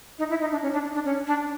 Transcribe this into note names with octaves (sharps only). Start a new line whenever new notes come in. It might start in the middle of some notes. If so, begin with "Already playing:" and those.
D#4
E4
D#4
D4
C#4
D4
D4
C#4
D4